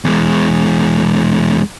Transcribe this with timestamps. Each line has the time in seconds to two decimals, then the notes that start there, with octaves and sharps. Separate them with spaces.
0.05 E2 G#3